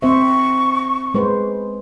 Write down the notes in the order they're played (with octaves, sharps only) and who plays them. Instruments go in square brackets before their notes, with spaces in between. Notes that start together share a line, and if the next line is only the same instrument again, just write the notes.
[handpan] C4 C5 E5 [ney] C#6
[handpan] G#3 B4 C5